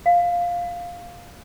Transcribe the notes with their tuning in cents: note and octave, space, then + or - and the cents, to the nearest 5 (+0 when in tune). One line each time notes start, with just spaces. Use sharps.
F5 +5